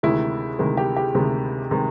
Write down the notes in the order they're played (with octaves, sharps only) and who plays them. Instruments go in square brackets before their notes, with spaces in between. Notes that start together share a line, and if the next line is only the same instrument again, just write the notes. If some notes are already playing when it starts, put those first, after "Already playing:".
[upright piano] D2 C3 D#3 G#3 E4
D2 C3 D#3 G#3
G4
G4
D2 C3 D#3 G#3
C3 D#3 G#3